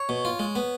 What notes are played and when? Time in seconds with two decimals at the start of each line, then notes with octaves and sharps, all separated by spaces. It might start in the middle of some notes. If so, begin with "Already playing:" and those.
Already playing: C#5
0.09 B2
0.25 F4
0.39 G#3
0.56 B3